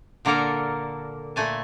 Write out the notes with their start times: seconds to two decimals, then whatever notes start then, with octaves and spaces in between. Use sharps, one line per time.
0.25 A#2 D3 A#3 A4 A#4 A#5
1.36 A#2 A3 G#5 A5